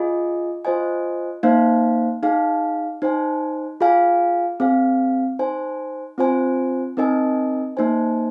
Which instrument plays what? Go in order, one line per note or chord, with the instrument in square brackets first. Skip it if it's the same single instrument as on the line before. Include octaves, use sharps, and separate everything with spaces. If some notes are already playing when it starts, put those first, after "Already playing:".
Already playing: [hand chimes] F4 G#4 D#5 G#5
F4 C5 D#5 G#5
A#3 D#4 C5 F5
D#4 G#4 F5 G#5
D#4 C5 G#5
F4 G#4 F5 G#5
C4 G#4 F5 G#5
D#4 C5 G#5
C4 F4 C5 G#5
C4 D#4 A#4 D#5 G#5
A#3 D#4 C5 G#5